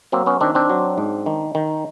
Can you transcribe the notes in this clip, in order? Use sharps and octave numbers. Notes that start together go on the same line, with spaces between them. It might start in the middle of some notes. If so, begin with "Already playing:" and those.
F#3 A#3 C4
B3 C#4
D#3 C4 D4
C4 D4
F#3
G#2
D#3
D#3